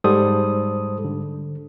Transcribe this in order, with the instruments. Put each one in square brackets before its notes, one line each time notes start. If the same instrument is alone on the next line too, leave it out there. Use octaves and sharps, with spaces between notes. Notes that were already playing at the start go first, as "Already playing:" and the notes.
[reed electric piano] G#2 G3 [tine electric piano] A4 C5 D#6
[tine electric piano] D3